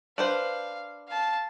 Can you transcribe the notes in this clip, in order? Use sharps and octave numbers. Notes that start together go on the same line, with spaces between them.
D4 B4 C5 F5
F5 A5